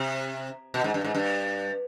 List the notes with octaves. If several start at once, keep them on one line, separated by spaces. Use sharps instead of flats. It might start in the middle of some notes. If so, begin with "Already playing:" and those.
Already playing: C3
B2
G#2
G2
G#2
G2